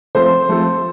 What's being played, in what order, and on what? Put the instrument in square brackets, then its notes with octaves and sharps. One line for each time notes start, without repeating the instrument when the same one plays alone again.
[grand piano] F3 A3 C4 A4 [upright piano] C5
[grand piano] F3 A3 C4 A4